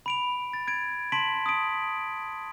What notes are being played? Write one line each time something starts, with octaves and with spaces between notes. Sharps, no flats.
B5 D7 F7
A6
G#6 D7
A5 C6 B6 D7 F#7
D#6 D7